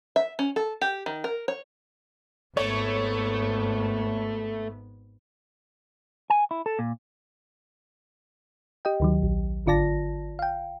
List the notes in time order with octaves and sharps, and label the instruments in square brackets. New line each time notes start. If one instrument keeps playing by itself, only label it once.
[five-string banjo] E5
C#4
A4
G4
D#3
A#4
C#5
[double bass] G#1 B3 [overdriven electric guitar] A3 [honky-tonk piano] C#5
[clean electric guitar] G#5
E4
A4
A#2
[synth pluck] G4 D#5 G5
D2 D#3 F#3
A#1
G#1 D3 F4 D5 A5 A#6
F5 G5